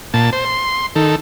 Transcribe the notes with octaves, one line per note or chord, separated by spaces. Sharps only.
A#2 A5
C5
C6
D#3 A4